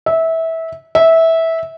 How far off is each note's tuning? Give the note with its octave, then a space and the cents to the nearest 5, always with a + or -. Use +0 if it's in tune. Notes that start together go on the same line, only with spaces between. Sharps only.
E5 -20
E5 -15